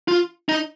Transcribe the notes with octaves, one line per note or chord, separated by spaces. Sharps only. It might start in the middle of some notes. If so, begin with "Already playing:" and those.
F4
D#4